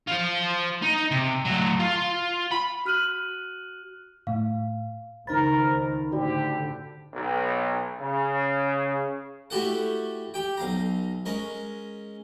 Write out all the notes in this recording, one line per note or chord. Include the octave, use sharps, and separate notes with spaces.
F4 C5
D#4
C3
F#3 A3
F4
B5
F#4 F6 F#6 D#7 F#7
A2 F5
C#2 D#3 D#4 A#4 C5 B5 A6
A2 D3 F#4 G4 D5
B1
C#3
A3 E4 F#4 G4 A4 F#5
G4 G5
B1 F5 A#5
G#3 C#4 A#4